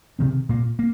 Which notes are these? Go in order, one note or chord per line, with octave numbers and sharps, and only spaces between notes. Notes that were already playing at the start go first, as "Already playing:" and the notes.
C3 D#3 C4
A#2 A#3
A#3